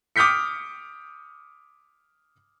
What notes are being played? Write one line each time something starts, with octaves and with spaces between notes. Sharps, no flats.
D6 D#6 F6 G6 B6 C#7